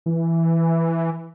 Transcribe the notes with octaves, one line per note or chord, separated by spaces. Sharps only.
E3